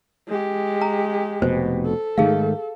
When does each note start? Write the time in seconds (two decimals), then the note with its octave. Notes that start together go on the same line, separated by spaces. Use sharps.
0.28 G#3 G4
0.81 A#5
1.42 F1 B2 C5
1.85 A4
2.18 G#2 D#3 A3 G#4 F5